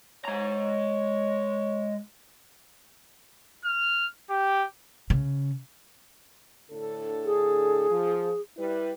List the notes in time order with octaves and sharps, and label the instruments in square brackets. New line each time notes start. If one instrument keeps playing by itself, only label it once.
[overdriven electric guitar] G#3 A#5 [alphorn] C#5
[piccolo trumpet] F6
G4
[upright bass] C#3
[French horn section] A2 D3 A4
[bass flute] G#4
[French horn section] F3
G3 E4 B4